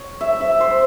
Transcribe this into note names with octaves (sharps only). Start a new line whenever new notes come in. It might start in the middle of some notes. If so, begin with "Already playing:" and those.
Already playing: C#5
E5
E5
C5